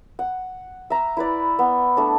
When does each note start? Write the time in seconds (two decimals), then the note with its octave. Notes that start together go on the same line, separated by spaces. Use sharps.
0.19 F#5
0.90 E5 A#5
1.17 E4 B4 D5
1.59 B3
1.97 A3 D4